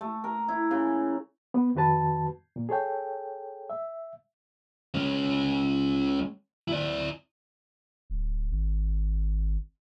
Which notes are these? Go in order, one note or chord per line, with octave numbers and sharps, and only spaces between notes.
A3
A#4
E4
C#3
B3
F2 D#3 F#4 B4 A5
A#2
G#4 A4 C#5 G5
E5
G#3 C#4
E4 D5
D1
G#1